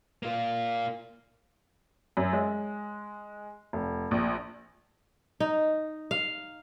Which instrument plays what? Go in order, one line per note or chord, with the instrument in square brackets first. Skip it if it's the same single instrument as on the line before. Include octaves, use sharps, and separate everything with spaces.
[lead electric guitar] A#3 F4
[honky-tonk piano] F#2
G#3
F1
A#1
[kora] D#4
F5